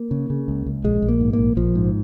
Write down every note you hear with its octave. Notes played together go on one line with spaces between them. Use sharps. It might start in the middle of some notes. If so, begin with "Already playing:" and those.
Already playing: A#3
C#3
C#3
C#2
C#2
A#1 G#3
A#1
A#3
G#2
A#3
A#1
A#1 F3
G#2